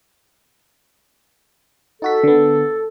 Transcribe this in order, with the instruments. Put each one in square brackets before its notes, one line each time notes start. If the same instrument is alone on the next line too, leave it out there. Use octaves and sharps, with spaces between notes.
[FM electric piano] D#4 F#4 B6 [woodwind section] A4
[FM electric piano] D3 B3